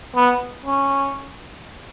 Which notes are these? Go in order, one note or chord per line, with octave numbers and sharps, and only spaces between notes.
B3
C#4